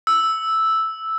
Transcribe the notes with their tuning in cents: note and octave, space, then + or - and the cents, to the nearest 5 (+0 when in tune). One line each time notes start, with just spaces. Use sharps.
E6 -5